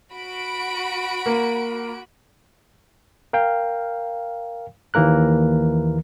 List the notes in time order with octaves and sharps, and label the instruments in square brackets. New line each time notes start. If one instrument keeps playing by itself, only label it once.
[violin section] F#4 B5 D7
[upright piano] A#3
[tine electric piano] A#4 F5 G5
D#2 E3 A#3 A#4 F#6